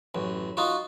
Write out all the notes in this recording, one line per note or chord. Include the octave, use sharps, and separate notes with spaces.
A1 F#2
D#4 F4 F#4